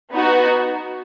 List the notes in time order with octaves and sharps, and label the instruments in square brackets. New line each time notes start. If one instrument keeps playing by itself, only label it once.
[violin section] B3 D#4 F#4